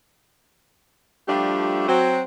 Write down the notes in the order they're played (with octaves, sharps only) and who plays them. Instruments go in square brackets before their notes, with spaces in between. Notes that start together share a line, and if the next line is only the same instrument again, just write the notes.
[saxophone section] F3 G3 A3 D4 F4 G4
F#3 C4 F#4